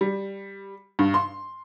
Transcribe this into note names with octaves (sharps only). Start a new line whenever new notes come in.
G3
G2
C6